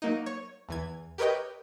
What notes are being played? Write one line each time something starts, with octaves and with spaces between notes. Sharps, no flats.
F#3 A#3 D#4
C#5
E2 E3 G#6
G4 A#4 B4 C#5 D#5 G5